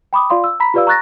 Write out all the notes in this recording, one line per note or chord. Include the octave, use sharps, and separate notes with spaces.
G5 B5 D6 D#6
F4 D5 F5 C6
E6
A#5 B5 B6
F4 G4 B4 D5 F5 E6
A#5 C#6 F#6 A6 A#6